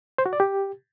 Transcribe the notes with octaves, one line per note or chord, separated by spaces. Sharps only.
C5
F#4
D5
G4